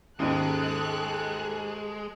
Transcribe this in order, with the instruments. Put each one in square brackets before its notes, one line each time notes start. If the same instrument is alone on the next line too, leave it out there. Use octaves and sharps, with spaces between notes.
[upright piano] D#2 G#2 [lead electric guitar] G#3 [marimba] C#4 [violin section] A4 F#6